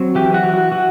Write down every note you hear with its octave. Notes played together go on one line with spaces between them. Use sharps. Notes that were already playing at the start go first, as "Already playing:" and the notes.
Already playing: F#3 C4
E3 G4
F#4
E3
F#4
E3 F#4